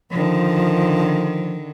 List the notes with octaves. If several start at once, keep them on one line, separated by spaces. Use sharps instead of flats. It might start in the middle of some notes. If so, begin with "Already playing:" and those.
D3 D#3 F3